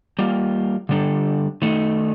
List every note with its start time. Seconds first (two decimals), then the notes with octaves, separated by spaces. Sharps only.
0.19 G3 A#3 F4
0.89 D3 G3 D4 A4
1.62 D#3 A3 D#4